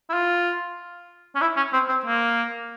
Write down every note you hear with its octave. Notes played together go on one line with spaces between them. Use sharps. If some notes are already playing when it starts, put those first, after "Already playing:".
E4
F4
C#4
E4
C#4
C4
C4
A#3